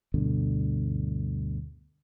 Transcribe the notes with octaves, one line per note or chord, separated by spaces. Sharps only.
D2 G2 B2 D3